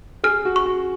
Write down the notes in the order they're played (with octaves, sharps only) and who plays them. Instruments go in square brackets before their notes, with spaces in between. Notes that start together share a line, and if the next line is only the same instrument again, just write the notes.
[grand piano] G#4 [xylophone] F6
[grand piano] F#4
[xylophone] C#6
[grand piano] F#4